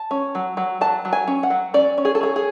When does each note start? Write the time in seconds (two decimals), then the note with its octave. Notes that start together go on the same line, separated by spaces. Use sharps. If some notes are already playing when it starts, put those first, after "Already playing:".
Already playing: A5
0.11 C#4
0.35 F#3
0.57 F#3
0.81 F#3 A5
1.05 F#3
1.13 G#5
1.28 C#4
1.43 F#5
1.50 F#3
1.74 C#4 D5
1.98 C#4
2.05 G#4
2.15 A4
2.21 C#4 G#4
2.36 G#4